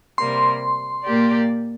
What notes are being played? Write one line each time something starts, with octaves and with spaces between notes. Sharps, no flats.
C3 G3 A#3 C6
A#2 A#3 G4 D5